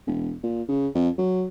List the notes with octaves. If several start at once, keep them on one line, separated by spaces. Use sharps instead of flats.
E1
A#2
C#3
F2
F#3